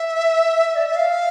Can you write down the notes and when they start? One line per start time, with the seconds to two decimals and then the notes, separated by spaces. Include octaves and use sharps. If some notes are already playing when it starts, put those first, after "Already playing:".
Already playing: E5
0.76 D5
0.86 E5
0.96 F5